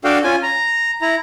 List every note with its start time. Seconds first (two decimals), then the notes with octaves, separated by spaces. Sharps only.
0.04 D4 F#4 A4 F5 G5
0.24 C#4 F4 G#5
0.43 A#5
1.01 E4 A#5